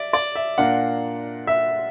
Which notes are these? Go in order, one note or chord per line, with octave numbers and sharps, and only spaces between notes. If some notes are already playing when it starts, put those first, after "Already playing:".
Already playing: D5 E5
D5
E5
A#2 A#3 D4 F#5
E5